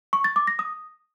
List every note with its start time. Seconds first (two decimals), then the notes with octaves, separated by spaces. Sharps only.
0.13 C#6
0.24 A6
0.36 D6
0.47 A#6
0.59 D#6